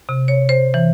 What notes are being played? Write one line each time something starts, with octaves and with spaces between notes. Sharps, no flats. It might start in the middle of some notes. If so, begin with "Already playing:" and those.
C3
C#5
C5
E3